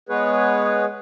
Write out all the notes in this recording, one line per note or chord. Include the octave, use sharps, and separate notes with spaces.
G#3 B3 G#4 B4 C#5